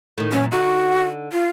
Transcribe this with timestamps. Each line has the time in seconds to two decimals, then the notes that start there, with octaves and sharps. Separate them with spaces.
0.18 A2 D#3
0.32 F#2 A#2 E3 C#4
0.52 D3 D#4 F#4
1.32 F4